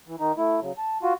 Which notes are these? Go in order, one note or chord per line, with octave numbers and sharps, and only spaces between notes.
E3
D#3 D#4
A3 E4
C#3 F#3
A5
F4 F#4